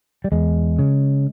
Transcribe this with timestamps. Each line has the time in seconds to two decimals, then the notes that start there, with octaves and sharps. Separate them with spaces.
0.24 G3
0.32 E2 G#3
0.79 C#3